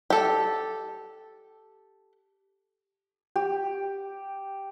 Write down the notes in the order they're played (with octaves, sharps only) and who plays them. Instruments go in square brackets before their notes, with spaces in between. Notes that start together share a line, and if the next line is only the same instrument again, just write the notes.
[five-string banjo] G4 A4
[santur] G4